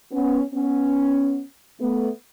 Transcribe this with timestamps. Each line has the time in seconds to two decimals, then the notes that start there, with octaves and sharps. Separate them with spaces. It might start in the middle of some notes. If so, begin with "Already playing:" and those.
0.12 B3 C#4
0.54 B3 C#4
1.80 A3 B3